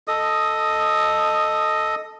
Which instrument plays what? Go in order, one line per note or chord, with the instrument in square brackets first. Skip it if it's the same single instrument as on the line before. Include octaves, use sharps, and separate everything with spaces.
[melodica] A4 D#5 D#6